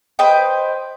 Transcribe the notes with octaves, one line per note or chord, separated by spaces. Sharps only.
B4 C5 D#5 G5